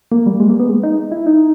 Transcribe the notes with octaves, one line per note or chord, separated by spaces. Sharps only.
A#3
G3
G#3
A#3
B3
G#3
D#4
E4
D#4